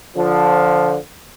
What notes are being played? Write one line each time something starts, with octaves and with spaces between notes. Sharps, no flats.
D3 F3